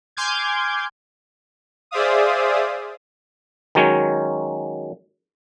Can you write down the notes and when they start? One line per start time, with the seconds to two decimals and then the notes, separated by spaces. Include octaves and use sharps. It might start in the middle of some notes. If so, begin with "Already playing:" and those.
0.17 G#5 C6 D6 F6 G6 G#6
1.91 G#4 C5 D5 E5 F5 D#6
3.75 D#3 F#3 G#3 C#4 C#5